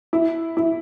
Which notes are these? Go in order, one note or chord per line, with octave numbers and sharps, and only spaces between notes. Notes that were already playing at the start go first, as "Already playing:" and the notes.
E4
E4